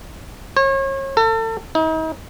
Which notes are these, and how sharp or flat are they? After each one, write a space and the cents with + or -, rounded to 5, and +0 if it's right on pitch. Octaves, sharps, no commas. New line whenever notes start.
C#5 -35
A4 +35
D#4 +40